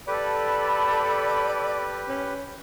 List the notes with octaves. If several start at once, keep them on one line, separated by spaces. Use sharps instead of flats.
G4 A4 B4 D5 B5
C#4